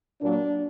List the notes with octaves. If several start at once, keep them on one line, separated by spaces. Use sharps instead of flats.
A#2 F#3 A#3 D4